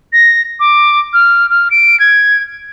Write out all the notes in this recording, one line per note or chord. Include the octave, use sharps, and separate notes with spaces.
A#6
D6
F6
F6
D7
G#6